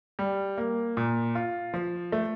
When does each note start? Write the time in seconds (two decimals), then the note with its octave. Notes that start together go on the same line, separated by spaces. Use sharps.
0.19 G3
0.58 A#3
0.97 A#2
1.35 F4
1.74 F3
2.12 A3